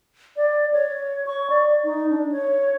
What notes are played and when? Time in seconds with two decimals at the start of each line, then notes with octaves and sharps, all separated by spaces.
0.36 D5
0.73 C#5
1.27 C#6
1.50 D5
1.84 D#4
2.09 D4
2.32 C#5